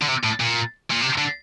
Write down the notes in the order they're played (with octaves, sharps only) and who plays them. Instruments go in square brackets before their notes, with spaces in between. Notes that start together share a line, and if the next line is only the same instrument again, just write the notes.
[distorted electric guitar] D3
C3
A2
A#2
A#2
C3
D3